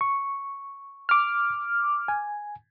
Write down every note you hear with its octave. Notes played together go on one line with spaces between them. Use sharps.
C#6
D6 F6
G#5